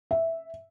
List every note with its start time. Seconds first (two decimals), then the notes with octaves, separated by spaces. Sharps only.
0.11 E5